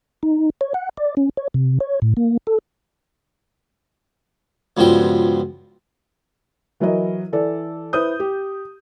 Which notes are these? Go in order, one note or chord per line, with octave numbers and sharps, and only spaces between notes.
D#4
C#5
F#5
D5
C#4
C#5
C3
C#5
A2
A#3
A4
C#2 G2 B2 F3 G5
E3 F#3 E4 A#4 D#5
E3 A4 D5
E4 B4 C5 D#6 G6
G4